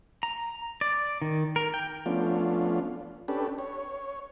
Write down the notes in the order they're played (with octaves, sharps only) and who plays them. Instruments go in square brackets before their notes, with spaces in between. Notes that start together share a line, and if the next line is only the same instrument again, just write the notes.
[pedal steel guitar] A#5
D5
D#3
A#4
G5
[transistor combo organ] F3 A3 B3 C#4 D4 F4
C#4 D4 G4 A4 B4
C#5